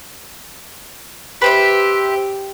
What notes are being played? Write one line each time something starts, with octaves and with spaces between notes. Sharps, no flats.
G4 B4 C5 E5